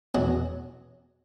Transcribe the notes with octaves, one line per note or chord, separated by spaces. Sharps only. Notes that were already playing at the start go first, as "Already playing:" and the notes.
E2 B2 F#3